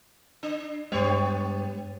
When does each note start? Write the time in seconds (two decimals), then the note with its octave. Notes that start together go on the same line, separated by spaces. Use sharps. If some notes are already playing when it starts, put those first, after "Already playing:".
0.43 D4
0.92 G2 G#3 B3 G4 C#5